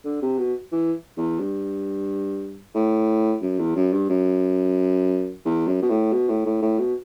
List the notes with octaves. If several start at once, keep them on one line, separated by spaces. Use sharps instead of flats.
D3
C3
B2
E3
E2
G2
A2
F#2
E2
F#2
G2
F#2
E2
F#2
B2
A2
B2
A2
A2
A2
B2